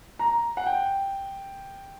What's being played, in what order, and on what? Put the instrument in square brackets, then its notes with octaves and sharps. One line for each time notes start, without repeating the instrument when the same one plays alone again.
[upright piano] A#5
F#5
G5